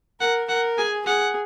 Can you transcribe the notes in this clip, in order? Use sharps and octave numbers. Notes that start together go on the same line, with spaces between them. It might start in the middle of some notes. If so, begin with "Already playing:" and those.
A#4 F#5
A#4 F#5
G#4 G#5
G#4 F#5